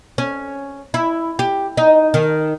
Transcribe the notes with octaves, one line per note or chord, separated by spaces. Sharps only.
C#4
E4
G4
D#4
D#3